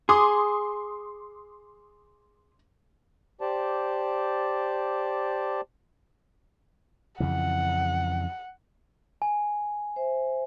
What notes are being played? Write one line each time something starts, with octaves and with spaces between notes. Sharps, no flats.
G#4 C6 D6 D#6
G4 C5 D5 A5
F2 C#3 E3 F#5
G#5
C5 E5